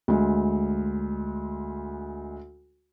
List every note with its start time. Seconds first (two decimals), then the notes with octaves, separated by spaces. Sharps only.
0.08 D2 G#3